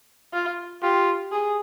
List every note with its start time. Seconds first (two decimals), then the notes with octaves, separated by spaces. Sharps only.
0.33 F4
0.82 F4 G4
1.32 G#4